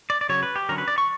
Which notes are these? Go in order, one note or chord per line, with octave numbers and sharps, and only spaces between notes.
D5
D5
C#3 F#3 C#4 C#5
B4
G4
D3 F#3 C#4 A#4
B4
D5
C#6